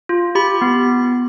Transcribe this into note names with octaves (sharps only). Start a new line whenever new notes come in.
F4
G4 B5
B3